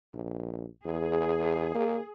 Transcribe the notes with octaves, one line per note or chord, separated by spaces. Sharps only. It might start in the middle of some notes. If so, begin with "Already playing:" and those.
A#1
E2 G#4
A#3